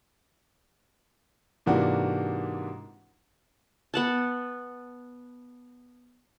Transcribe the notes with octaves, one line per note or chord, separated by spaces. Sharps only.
G#2 C3 E3 A#3 D4 F#4
B3 F#5 A5